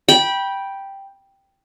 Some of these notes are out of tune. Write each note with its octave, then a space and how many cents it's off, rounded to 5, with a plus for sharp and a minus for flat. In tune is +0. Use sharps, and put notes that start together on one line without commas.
G5 +0 B5 -20